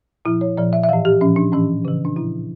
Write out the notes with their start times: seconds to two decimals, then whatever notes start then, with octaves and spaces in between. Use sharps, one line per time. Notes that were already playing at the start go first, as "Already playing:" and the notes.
0.25 A#2 F3 E4
0.41 C#5
0.58 A#2 F3 D5
0.73 E5
0.84 E5
0.89 A2 E3 F5
1.05 G4
1.21 A#2 F3 C#4
1.36 D4
1.52 A2 E3 C#4
1.85 C#3 E3
2.05 D4
2.16 A#2 F3 E4